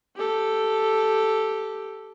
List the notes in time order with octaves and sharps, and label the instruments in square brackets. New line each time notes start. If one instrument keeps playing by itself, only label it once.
[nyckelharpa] G4 A4